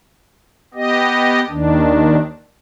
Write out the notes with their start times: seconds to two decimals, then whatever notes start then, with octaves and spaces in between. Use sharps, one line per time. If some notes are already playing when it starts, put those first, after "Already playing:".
0.74 B3 G4 D#5
1.49 D#2 D#3 D4